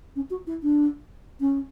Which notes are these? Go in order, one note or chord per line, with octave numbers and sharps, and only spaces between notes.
C#4
F#4
E4
D4
C#4